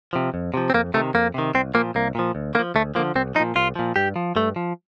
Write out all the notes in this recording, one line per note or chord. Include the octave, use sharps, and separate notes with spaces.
C3 F3
F2
C3 F3
C4
F2 A#3
C3 D#3 A3
F2 A#3
C3 D#3
C2 C4
A#2 F3 A#3
C2 A#3
A#2 F3
D2
D3 A#3
F3
D2 A3
D3 F3 A#3
C2 C4
F3 D#4
A#2
C2 F4
A#2 F3
G2 G4
F3
G2 A3
F3